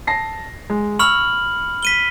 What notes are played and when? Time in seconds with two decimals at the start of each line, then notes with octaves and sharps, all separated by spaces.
0.07 A5 A#6 C7
0.70 G#3
0.99 B5 C#6 E6 F6 F#7
1.83 B6 D#7 G7